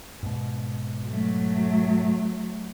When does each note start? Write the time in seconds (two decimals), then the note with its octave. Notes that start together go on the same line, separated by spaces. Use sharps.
0.23 G#2 B2
1.07 F#3 A3